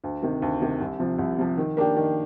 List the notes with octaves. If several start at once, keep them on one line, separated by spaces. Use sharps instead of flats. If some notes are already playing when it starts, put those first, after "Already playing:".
D2
C3 D#3
D2
C3 D#3
C2
C3 F3
C2
C3 F3
D#3
A#3 D4 G4
D#3